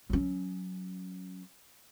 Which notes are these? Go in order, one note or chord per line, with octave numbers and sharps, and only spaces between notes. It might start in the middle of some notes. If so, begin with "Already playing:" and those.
F#3 C#4